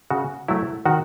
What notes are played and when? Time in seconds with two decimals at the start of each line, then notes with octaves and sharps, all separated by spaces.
0.10 C#3 F#4
0.48 F#3 A3 E4
0.85 D#3 F#4